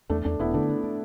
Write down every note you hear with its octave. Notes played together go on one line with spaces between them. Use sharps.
E2 A3 D4
E2 A3 D4
E1 B3 E4
D3 A3 D4
D4
D4